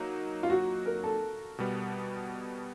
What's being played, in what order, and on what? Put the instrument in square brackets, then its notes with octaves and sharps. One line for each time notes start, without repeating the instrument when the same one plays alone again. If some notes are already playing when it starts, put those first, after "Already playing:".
Already playing: [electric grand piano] F#3 A#3 D#4
[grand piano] F4
F#4
A#4
A4
[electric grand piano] B2 G3 B3